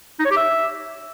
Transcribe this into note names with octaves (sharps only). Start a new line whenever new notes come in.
D#4
C#5
G4
E5